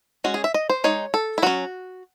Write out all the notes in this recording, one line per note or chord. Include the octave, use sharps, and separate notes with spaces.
G#3 C#4 F#4
G#4
E5
D#5
C5
G#3 D#4 C#5
A4
E4
F#3 C#4 F#4